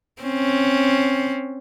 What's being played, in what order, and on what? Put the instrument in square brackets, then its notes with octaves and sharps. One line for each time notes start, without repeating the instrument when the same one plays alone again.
[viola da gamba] C4 C#4